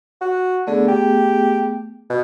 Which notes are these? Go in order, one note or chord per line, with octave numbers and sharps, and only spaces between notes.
F#4
D3 A3 B3 G#4
G4
B2